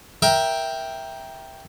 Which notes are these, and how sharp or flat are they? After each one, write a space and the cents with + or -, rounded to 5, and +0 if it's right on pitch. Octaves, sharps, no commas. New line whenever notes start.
A#4 +15 E5 +0 G5 +0